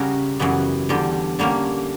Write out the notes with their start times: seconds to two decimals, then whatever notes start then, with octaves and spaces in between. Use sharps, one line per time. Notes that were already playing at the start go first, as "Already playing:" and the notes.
Already playing: C#3 G3 C#4 F#4 A#4
0.39 F#2 C#3 E3 G3 B3
0.89 E2 D3 G3
1.39 D3 G3 A#3 C#4